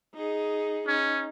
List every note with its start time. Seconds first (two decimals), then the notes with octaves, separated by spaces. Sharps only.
0.15 D#4 G#4
0.88 C#4 D#4